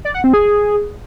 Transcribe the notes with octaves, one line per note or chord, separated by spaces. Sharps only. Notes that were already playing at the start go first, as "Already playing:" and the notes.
D5
F#5
C4
G#4